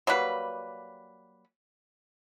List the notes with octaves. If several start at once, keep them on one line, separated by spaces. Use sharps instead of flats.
F#3 G3 A#3 B4